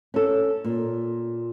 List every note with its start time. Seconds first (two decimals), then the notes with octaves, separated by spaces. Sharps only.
0.14 C#4 A4
0.65 A#2